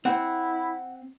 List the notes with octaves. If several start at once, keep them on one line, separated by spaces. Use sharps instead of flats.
C4 E4 F#5